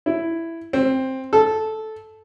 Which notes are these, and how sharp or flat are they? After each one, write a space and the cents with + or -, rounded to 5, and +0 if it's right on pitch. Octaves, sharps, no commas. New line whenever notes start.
E4 +5
C4 +10
A4 -10